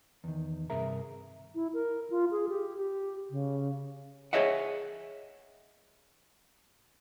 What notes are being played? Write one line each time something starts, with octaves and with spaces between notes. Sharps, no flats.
E2 D#3
G2 C3 G#4 A#4 E5 A#5
E4
A#4
F4
G#4
G4
G4
C#3
G#4 C#5 D#5 E5 F#5